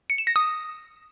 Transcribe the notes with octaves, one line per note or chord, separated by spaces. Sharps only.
C#7
E7
A#6
D#6